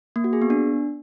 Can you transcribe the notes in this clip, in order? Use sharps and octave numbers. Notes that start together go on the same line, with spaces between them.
A#3
F#4
G#4
B3
D4